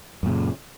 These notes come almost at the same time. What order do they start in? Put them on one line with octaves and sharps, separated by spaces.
F#2 A#2 C#3